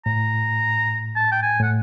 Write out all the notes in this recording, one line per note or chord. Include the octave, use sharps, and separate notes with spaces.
A2 A#5
A5
G5
G#5
A2 F#5